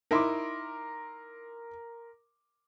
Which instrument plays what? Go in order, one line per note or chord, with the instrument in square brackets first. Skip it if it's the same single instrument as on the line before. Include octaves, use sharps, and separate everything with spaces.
[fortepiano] D#4 E4 [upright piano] A#4 C6 D6